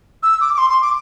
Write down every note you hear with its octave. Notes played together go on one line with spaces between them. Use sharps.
E6
D6
D6
C6
C6
D6